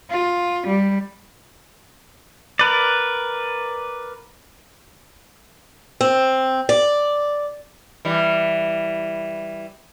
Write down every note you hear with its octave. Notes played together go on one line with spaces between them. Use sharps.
F4
G3
A#4 B4 D5
C4
D5
E3 G3